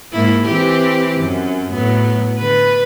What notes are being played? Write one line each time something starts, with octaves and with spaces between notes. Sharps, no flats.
G#2 A#3 E4
E3 C4 G4
F#2
A2 F#3 B3
D3 B4